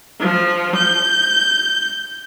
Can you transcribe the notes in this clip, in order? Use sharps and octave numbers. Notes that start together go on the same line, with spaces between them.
F3
G6